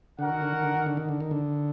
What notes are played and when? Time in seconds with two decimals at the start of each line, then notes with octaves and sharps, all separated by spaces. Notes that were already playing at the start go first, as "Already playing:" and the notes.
0.19 D3 F#4 A#4 F#5
0.30 D#3
0.42 D3
0.52 D#3
0.63 D3
0.75 D#3
0.86 D3
0.97 D#3
1.09 D3
1.20 D#3
1.31 D3